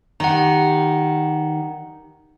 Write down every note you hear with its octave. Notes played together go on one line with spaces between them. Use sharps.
D#3 G3 B3 G4 F#5 A#5